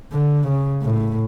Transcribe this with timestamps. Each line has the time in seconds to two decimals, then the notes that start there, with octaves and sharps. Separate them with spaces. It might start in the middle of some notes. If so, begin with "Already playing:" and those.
0.12 D3
0.47 C#3
0.82 A2